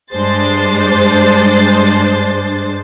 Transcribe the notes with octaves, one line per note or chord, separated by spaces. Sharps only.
G2 G#3 D4 C5 A6